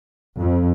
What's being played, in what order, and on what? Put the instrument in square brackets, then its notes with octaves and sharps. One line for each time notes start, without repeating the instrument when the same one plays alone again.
[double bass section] F2